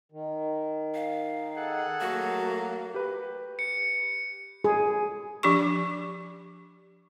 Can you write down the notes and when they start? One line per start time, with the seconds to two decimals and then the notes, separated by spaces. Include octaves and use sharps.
0.12 D#3
0.94 F5
1.56 G#4 A4 F#5
2.01 F#3 A3 A#3 F#4
2.94 G4 B4
3.59 C#7
4.64 G#4
5.43 F3 D4 G4 C#6